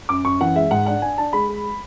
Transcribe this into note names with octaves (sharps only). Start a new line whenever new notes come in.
F#2 D6
F#2 C#6
E3 F#5
G#3 E5
G#2 F#5
D4 F#5
D4 G#5
D4 A5
G#3 B5
G#3